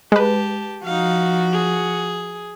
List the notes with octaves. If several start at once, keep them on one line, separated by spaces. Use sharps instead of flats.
G#3 G4 B4 A5
F3 D#4 F#4 F5
G#4